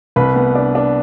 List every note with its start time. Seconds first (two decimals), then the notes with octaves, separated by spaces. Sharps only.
0.16 C2 B4 B5
0.36 B3
0.55 D4
0.75 D4